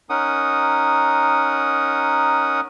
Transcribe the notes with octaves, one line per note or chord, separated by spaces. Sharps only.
C#4 D#4 A#4 F#5 D#6